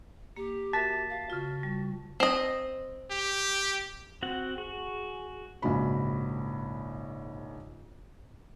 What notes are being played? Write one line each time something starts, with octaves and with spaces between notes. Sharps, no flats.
A#3 G4
F#4 A#4 E5 A5 A6 B6
F5
C#3 F4 F#4
G3
C4 D#5
G4
C4 F#4 F#5
F#4 G#4
A#1 G#2 C#3 F#4 B5